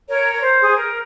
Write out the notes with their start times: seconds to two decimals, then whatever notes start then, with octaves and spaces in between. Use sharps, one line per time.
0.08 A#4 C#5
0.33 A#4
0.41 C5
0.63 G#4
0.75 A#4